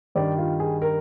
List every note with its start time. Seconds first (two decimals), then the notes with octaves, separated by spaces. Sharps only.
0.15 G2 D#3 G3 D5
0.38 F4
0.60 G#4
0.82 A#4